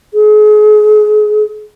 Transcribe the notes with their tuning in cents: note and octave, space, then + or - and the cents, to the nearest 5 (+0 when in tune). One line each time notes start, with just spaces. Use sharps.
G#4 +35